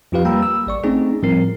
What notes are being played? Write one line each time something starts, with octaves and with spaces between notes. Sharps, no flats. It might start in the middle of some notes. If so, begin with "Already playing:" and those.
F2 F3 F4 G4 B4 F5
G3 A#3 G5 A#5 B5 E6
E6
A1 D5 C#6
A3 C4 C#4 D#4 G#4
A2 F3 G3 C4 A#4 C7